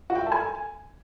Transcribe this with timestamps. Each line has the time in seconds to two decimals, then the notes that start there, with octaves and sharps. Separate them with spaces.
0.10 F#4
0.15 G5
0.21 E5
0.26 A4
0.32 G#5